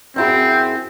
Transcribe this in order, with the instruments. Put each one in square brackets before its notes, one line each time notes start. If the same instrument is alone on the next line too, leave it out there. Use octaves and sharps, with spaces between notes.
[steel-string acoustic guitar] F#2 E4 G#4 [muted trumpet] C4